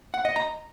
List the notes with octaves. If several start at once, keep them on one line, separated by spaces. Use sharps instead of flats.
F#5
D#5
A#5